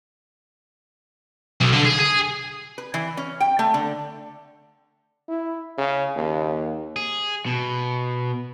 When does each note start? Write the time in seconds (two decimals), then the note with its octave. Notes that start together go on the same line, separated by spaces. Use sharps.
1.61 B1
1.73 D3
1.85 G#4
1.99 G#4
2.78 B4
2.94 E3
3.17 C#4
3.40 G5
3.59 A3
3.74 D3
5.28 E4
5.78 C#3
6.15 D#2
6.96 G#4
7.46 B2